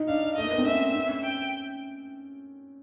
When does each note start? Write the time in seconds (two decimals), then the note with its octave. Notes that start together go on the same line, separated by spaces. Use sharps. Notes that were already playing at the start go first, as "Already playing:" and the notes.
Already playing: D#4
0.08 D4 F5
0.36 A3 D#5
0.44 A#3
0.51 B3
0.58 C4
0.66 C#4 E5
0.95 C#4
1.23 G5